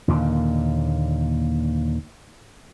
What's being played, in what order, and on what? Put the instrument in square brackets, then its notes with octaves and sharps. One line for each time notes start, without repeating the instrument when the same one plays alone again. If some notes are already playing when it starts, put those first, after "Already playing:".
[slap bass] D#2 A#2 D3